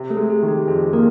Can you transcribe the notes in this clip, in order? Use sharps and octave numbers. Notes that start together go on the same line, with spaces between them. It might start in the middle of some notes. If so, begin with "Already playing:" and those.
Already playing: C3
A3 A4
G#3
G#4
D#3
G4
F2 G#4
C3 A#3 A#4